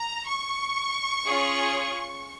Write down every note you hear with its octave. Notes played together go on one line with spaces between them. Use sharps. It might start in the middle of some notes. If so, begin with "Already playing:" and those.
Already playing: A#5
C#6
C#4 F4 G#4